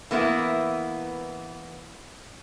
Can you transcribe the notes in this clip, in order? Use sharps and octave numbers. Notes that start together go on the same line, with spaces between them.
E3 A#3 B3 E4